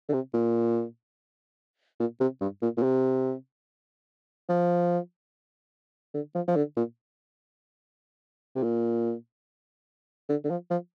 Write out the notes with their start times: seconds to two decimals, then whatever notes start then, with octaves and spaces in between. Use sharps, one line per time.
0.09 D3
0.14 C3
0.34 A#2
2.00 A#2
2.20 C3
2.41 G2
2.62 A#2
2.77 A#2
2.83 C3
4.49 F3
6.14 D3
6.35 F3
6.48 F3
6.56 D3
6.77 A#2
8.56 C3
8.63 A#2
10.29 D3
10.44 D3
10.50 F3
10.71 F3